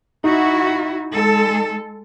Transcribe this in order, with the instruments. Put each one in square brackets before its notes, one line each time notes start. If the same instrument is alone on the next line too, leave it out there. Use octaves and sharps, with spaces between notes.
[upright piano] D#4 [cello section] E4 F#4
[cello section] G#3 A4